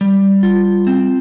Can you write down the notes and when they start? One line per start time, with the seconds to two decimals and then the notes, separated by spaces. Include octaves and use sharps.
0.01 G3
0.43 F4
0.87 C4